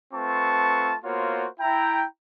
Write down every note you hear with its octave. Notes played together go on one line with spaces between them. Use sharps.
A3 C4 F4 B4 A5 C#6
A#3 B3 F4 F#4 C5 C#5
E4 G5 A#5